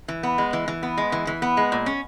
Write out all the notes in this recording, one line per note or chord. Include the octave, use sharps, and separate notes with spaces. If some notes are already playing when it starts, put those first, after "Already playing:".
E3
B3
G#3
E3
E3
B3
G#3
E3
E3
B3
G#3
A#2
C#4